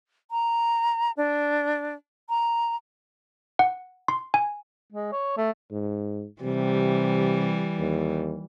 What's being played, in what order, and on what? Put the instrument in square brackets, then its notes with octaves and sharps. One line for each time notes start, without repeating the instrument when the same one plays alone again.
[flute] A#5
D4
A#5
[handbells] F#5
C6
G#5
[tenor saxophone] G#3
C#5
A3
[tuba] G#2
[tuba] C3 [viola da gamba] E3 G3
[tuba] D#2